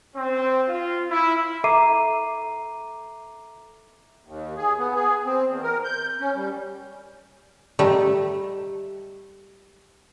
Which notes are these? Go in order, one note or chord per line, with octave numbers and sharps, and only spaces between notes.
C4
F4
E4
A4 E5 A#5 D6 C7 D#7
D#2
G#4
B3
G#4
C4
E2
A#4
G6
C#4
G3
G3 A3 D#4 G4